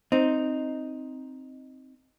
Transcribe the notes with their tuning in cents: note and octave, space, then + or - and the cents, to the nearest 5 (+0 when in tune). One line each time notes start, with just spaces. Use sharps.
C4 +0 D#4 +0